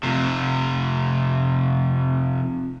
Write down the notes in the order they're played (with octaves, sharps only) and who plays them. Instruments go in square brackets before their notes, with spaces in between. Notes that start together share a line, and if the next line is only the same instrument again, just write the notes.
[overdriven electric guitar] F2 C3